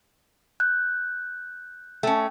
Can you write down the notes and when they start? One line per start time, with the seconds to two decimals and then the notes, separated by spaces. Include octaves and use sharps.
0.60 F#6 G6
2.03 A3 C#4 G5